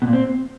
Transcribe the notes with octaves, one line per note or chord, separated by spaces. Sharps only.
B2
A#2
C4